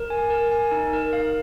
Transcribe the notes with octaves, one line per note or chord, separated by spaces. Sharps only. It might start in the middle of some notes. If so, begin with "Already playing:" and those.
Already playing: A#4
G#5
A#4
G#5
D#4
A#4
F5